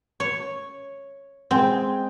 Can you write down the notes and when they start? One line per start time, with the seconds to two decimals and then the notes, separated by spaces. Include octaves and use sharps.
0.20 C#5
1.51 G#3 C4 G5 G#5